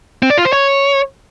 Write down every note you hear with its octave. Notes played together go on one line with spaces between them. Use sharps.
C4
D5
F4
C5
C#5